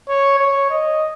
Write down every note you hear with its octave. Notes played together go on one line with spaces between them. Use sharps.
C#5
C#5
D#5